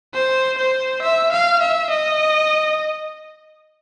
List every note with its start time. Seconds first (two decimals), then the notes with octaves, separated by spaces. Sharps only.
0.14 C5
0.58 C5
1.02 E5
1.32 F5
1.61 E5
1.90 D#5